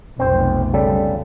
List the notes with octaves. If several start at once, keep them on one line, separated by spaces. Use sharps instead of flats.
F1 B1 C4 C5
C#3 G3 A4